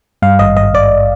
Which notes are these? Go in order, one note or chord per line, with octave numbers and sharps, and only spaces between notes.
G2 F5
G#1 D#5
G#1 D#5
G#1 D5